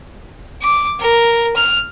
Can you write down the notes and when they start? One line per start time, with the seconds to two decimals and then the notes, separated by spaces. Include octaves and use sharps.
0.62 D6
1.00 A#4
1.56 F6